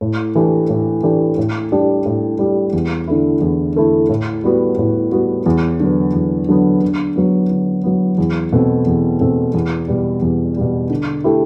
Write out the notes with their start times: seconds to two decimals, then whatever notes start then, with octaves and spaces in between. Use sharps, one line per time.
0.01 A2
0.35 E3 A3 D4 G4
0.69 A2
1.03 E3 A3 D4 G4
1.38 A2
1.72 G3 D4 G4
2.06 A2
2.39 G3 D4 G4
2.73 E2
3.07 D3 A3 E4
3.41 E2
3.75 D3 A3 E4
4.09 A2
4.44 G3 B3 F#4
4.78 A2
5.12 G3 B3 F#4
5.46 E2
5.80 D3 F#3 B3
6.14 E2
6.49 D3 F#3 B3
6.82 D3
7.16 F#3 B3
7.50 D3
7.84 F#3 B3
8.18 E2
8.52 B2 A3 C4
8.87 E2
9.21 B2 A3 C4
9.54 E2
9.88 B2 G3
10.22 E2
10.57 B2 G3
10.90 D3
11.24 A3 E4 G4